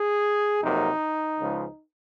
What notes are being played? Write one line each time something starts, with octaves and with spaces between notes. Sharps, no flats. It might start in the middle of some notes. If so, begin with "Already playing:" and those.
Already playing: G#4
F2 C3 F#3 A#3 D#4
C#2 C#3 F3 G#3